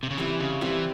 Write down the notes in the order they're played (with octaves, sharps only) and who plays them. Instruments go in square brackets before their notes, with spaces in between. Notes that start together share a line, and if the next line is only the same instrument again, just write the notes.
[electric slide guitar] C3
C#3
[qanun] C3 G3 C4 [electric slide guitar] E3
[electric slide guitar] C#3
[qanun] C3 G3 C4 [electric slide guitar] E3